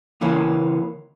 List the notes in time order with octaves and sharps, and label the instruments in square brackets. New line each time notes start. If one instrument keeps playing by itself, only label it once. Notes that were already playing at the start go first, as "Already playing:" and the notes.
[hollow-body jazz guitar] C#2 E3 A#3 C#4